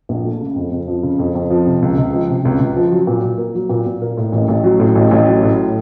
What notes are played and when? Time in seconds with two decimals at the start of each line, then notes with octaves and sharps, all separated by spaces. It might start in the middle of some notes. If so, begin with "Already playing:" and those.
0.09 A#1
0.25 A3
0.41 C#3
0.56 F2
0.71 F2
0.88 F3
1.03 C#3
1.19 F2
1.35 F2
1.50 F3
1.66 C3
1.82 C#2
1.98 C#2
2.13 F3
2.29 C3
2.45 C#2
2.60 C#2
2.76 F3
2.91 F#3
3.07 A#2
3.23 A#2
3.38 A#3
3.55 F#3
3.69 A#2
3.86 A#2
4.02 A#3
4.17 A2
4.32 A1
4.48 A1
4.64 F#3
4.79 A2
4.96 A1
5.11 A1
5.27 F#3
5.43 A2